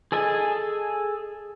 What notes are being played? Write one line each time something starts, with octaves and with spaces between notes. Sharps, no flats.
G#4 A4 D#5 G#5